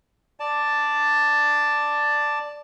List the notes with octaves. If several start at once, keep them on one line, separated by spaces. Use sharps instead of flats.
D5 A5